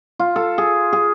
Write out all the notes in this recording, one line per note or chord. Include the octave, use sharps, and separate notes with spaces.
F4
A4
G#4
G#4